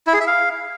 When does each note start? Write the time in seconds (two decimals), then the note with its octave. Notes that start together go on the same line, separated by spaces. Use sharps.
0.07 E4
0.14 G#4
0.20 E5
0.27 F5